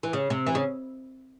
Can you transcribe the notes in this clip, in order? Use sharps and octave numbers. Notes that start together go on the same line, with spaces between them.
E3
C#3
C3
E3
C#3